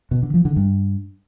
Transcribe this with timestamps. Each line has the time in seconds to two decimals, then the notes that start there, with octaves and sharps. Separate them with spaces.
0.11 B2
0.23 D3
0.34 F3
0.45 D3
0.56 G2